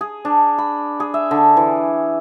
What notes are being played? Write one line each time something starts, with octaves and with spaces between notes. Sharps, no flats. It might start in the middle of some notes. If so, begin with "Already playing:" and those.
G#4
D4
B5
G#4
E5
D3
E3